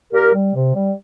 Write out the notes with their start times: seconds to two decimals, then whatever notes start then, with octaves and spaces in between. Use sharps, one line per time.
0.12 A#2 G4 A#4
0.33 G3
0.53 C3
0.74 G3